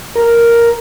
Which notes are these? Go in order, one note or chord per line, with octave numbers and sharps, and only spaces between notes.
A#4